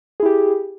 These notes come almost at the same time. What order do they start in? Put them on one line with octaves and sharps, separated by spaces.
G#4 E4 G4